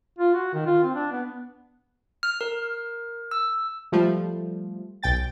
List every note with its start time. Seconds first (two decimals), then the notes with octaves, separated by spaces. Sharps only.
0.18 F4
0.34 F#4
0.54 D#3
0.66 F4
0.83 C4
0.95 D4
1.11 B3
2.23 F6
2.41 A#4
3.31 E6
3.92 F3 G3 A3
5.03 B1 G5 A6